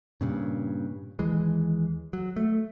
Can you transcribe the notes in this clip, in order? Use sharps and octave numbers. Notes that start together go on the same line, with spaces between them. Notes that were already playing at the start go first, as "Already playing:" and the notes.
G2 A#2 C#3
D#2 E3 G#3
F#3
A3